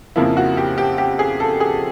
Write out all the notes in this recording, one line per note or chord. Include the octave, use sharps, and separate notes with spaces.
F2 C#3 F3 A#3 E4
F#4
G4
G4
G4
G#4
A4
G#4